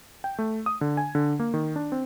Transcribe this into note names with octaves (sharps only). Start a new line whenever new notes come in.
G5
A3
D#6
D3
G#5
D3
A#3
D#3
D4
C4